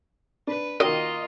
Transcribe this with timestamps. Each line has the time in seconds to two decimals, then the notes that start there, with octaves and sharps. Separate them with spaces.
0.47 D4 B4
0.80 D#3 A#3 F4 F#4 D#5